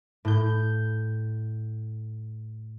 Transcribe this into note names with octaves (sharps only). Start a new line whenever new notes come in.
A2 G6